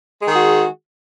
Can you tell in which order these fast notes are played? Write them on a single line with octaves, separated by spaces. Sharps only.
G#3 D#3 G#4 F#4